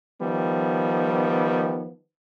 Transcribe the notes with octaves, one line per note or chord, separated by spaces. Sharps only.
D#3 F3 G3 B3